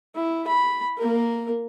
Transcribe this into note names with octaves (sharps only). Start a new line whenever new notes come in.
E4
B5
A#3 A#4